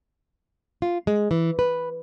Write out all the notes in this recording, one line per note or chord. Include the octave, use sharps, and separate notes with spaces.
F4
G#3
E3
B4